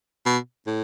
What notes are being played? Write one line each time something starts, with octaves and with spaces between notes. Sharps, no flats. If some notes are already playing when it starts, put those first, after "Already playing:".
B2
A2